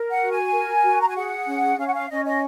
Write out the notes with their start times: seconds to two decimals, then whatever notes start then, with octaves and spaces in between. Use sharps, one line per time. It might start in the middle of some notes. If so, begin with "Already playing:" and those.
Already playing: A#4
0.10 F#5
0.21 F#4
0.31 G#5
0.52 A#4
0.83 F#4
1.00 A#5
1.08 G#5
1.15 G#4 F#5
1.46 C#4
1.78 C#4 F5
1.86 F#5
1.94 F5
2.10 C#4 D#5
2.25 D#5